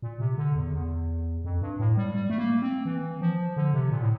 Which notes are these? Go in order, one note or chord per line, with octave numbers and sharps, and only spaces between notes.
A#2
C3
D3
E2
E2
F2
G2
A2
G3
G3
A3
A#3
C4
E3
F3
D3
C3
A#2
A2